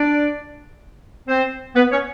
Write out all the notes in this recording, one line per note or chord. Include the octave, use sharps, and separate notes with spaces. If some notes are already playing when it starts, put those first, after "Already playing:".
Already playing: D4 D5
C4 C5
B3 B4
C#4 C#5